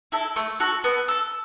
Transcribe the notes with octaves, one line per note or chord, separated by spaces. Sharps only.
E4 A4
A3
F#4 A4
B3
A4